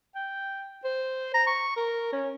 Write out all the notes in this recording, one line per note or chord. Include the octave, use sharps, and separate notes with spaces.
G5
C5
A#5
C#6
A#4
C#4